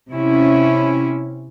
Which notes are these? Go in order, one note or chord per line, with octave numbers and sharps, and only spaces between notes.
C3 C#4 E4